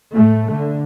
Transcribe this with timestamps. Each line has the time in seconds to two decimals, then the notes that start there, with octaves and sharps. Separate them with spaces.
0.13 A2 A3
0.52 D3